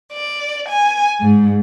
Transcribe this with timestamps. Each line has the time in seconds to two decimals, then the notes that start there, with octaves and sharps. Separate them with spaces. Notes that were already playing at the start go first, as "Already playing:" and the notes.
0.13 D5
0.67 G#5
1.20 G#2